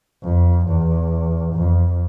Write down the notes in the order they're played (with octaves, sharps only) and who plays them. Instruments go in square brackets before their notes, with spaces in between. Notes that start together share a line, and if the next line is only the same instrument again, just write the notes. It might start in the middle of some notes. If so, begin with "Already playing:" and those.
[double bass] F2
E2
F2